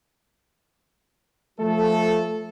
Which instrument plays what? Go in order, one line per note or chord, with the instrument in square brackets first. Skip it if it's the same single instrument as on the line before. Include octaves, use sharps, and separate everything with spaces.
[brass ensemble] F3 A4 [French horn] A3